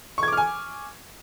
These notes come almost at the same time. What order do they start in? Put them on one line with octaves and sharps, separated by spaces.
C#6 G#6 D6 F6 G#5